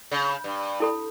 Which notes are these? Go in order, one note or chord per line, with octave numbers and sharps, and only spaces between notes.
C#3
G2
E4 A4 B5